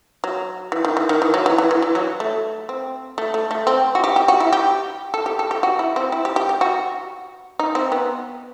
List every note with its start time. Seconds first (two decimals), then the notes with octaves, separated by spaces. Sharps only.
0.24 F#3
0.72 E3
0.85 D#3
0.97 E3
1.09 D#3
1.22 E3
1.34 F#3
1.46 E3
1.58 E3
1.71 E3
1.82 E3
1.95 F#3
2.20 A3
2.69 C4
3.18 A3
3.34 A3
3.51 A3
3.67 C4
3.95 F#4
4.04 G4
4.16 G4
4.28 F#4
4.40 E4
4.53 G4
5.14 A4
5.26 G4
5.39 A4
5.51 G4
5.63 F#4
5.79 E4
5.96 C4
6.12 E4
6.25 G4
6.36 G4
6.49 G4
6.61 F#4
7.59 D#4
7.75 C4
7.92 B3